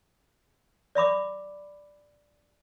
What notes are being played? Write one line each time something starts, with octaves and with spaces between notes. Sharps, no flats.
D5 E5 B5 D6